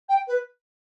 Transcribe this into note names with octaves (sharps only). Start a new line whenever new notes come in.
G5
B4